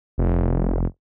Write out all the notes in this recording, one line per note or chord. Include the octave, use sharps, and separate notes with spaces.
F1